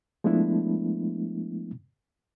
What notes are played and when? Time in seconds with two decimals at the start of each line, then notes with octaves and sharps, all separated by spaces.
0.24 F3 G#3 A3 B3 D4 E4